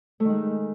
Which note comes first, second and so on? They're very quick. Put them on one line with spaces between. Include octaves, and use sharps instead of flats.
A3 D#3 G#3